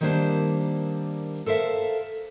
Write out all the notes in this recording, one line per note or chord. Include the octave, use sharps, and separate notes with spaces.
D#3 G3 A#3 D4 C5
A4 A#4 C5 E5 F5